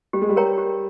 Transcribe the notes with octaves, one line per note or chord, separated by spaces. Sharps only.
G3 G4
G#3
G3
A#4 C#5 G5 A#5
G4